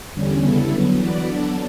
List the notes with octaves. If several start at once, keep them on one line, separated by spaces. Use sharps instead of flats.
E2 D3 G3 C#4
C#3 G3 B3 E4 A4
D3 F#3 B3
E3 B3 F#4 B4 D5
F#3 B3 D4 A4